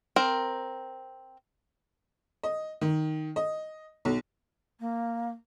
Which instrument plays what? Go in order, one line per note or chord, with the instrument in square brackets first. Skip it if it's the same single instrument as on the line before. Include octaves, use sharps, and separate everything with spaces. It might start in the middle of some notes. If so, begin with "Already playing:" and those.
[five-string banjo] C4 A#4
[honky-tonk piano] D#5
D#3
D#5
B1
[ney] A#3